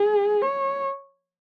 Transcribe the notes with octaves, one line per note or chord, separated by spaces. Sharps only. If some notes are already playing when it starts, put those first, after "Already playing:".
Already playing: G#4
C#5